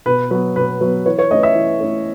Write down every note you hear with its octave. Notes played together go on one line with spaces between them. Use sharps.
B2 B4
F#3 B3 B4
B2 B4
F#3 B3
E3 C#5
C#5
A3 C#4 D#5
E5
E3
A3 C#4